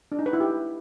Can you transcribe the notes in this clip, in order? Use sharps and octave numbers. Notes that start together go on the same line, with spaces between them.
D4
D#4
B4
E4
G4